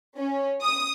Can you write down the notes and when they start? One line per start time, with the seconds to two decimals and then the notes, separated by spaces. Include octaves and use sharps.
0.18 C#4
0.62 D#6